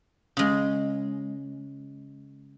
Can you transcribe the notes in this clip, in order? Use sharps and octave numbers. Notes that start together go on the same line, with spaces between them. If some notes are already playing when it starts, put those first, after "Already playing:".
C#3 G#3